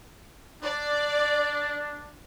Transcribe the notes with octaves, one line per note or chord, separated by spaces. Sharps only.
D4 D5